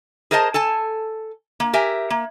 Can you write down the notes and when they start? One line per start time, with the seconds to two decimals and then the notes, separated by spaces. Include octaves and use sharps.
0.31 G#4 A#4 C5 D#5 F#5 A5
0.54 A4 G#5 A5
1.60 A#3
1.73 G4 A#4 E5 G#5
2.10 A#3